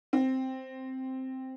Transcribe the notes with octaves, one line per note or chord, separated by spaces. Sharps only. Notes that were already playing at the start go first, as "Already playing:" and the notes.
C4